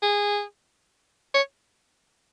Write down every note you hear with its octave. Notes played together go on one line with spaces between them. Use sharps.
G#4
C#5